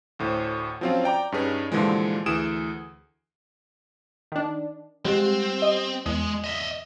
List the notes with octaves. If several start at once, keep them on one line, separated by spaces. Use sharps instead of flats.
D2 A2 C5
F3 F#3 C4 C#4 F4
D5 G5 A#5 D6
G2 C#4 D#4 G#4 B4
A#2 D3 E3 F3 G3 G#3
D2 E3 G#4 D#6 D7 E7
D#3 D4
G3 G#3 C4 G4
D#5
E2 G#3 D#6
D#5 E5